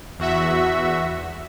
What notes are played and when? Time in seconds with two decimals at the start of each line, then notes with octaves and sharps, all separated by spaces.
0.19 E2 F#4 E5